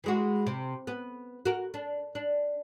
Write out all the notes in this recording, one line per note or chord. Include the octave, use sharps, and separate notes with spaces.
E3 G#3 F#4
C3
B3
F#4 A#4
D4
D4